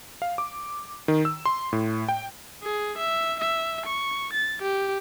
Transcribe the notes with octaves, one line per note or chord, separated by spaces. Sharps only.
F5
D6
D#3
E6
C6
A2
G5
G#4
E5
E5
C#6
A6
G4